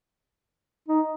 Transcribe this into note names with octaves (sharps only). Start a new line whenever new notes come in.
D#4